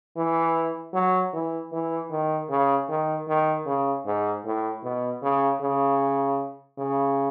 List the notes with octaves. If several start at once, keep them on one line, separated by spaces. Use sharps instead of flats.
E3
F#3
E3
E3
D#3
C#3
D#3
D#3
C#3
G#2
A2
B2
C#3
C#3
C#3